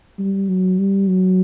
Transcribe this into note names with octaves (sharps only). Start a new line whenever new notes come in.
G3
F#3
G3
F#3